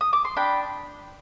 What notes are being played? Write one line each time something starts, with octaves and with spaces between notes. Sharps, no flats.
D#6
D6
C6
D4 G5 B5